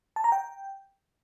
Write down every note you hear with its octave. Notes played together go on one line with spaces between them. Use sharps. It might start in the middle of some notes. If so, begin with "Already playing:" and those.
A5
A#5
G5